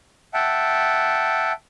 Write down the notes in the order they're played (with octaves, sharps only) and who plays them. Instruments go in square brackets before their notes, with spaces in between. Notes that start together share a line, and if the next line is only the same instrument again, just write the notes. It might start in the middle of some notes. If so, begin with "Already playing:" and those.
[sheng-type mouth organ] E5 F#5 G5 A5